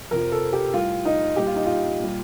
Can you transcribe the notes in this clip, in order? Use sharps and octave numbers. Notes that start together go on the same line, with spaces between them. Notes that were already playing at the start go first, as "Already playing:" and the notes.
F2 C3 F3 A#4
A4
G4
A2 G3 F4
D#4
A#2 G3 G4
F4
D#4
F4
A#2 G3